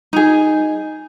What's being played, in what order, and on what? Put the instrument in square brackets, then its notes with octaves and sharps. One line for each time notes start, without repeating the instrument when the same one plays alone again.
[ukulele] D#4 G#4